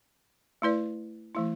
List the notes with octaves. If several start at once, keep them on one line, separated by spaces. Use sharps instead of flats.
A3 E4 B4 D5
E3 A3 E4